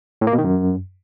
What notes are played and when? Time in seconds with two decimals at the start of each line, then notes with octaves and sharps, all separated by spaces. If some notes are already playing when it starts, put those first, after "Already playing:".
0.21 A2
0.27 A#3
0.33 B2
0.38 D#3
0.44 F#2